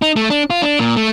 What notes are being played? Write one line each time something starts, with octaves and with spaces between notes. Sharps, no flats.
D#4
A3
D4
F4
D4
A#2
A3